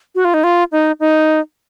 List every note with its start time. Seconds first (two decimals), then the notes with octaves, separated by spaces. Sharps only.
0.15 F#4
0.25 F4
0.34 D#4
0.44 F4
0.72 D#4
1.00 D#4